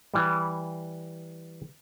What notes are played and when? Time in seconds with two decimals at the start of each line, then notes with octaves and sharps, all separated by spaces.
0.14 E3 G3